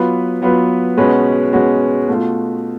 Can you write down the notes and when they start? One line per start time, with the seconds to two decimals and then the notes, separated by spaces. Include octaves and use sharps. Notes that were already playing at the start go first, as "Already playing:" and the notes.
Already playing: F#3 B3 F4 B4
0.42 F#3 B3 F4 B4
0.97 B2 G#3 C#4 F#4 B4
1.52 B2 G#3 C#4 F#4 B4
2.08 B2 A3 F4